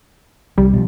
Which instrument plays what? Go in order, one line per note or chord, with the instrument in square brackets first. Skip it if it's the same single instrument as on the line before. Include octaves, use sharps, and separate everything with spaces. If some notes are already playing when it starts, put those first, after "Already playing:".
[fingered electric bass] C2 [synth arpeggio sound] G3
[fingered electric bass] B2 F3